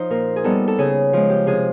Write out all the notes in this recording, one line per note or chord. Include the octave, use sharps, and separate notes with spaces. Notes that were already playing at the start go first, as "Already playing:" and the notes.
Already playing: F3 D#4 C5
A#2 A#4
G#4
G3 B3 D#4 A4
A4
C#3 G#4
F3 G#3
G4
C3 G#4